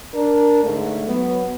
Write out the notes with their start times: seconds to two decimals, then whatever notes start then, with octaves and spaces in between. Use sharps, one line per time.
0.14 D4 A#4
0.64 G#2 D3 G#3 A3
1.08 F#3 B3